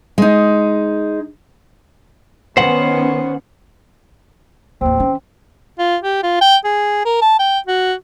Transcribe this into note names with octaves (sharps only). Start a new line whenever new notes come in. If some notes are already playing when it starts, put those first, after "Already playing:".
G#3 D#4
D#3 B3 C#4 C5 F#5
A1 D#2 C4
E3 C#4
F4
G4
F4
G5
G#4
A#4
A5
G5
F#4